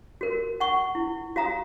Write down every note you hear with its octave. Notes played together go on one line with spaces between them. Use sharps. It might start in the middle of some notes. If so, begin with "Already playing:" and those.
F#4 A#4
F#5 C#6
E4
F#4 F5 A#5 D#6